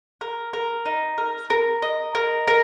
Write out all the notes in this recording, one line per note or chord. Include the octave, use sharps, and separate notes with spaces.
A#4
A#4
D#4
A#4
A#4
D#5
A#4
A#4